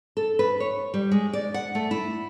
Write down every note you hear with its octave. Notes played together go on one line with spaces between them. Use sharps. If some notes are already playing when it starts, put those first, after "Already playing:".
A4
B4
C#5
G3
G#3
D5
F#5
A3
E4